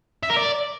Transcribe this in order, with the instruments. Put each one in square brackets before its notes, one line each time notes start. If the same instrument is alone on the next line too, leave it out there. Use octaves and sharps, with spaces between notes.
[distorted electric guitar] E5
A#4
D5